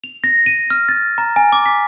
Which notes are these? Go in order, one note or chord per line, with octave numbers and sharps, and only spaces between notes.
F7
A#6
D#7
F6
A6
A#5
G#5
D6
B6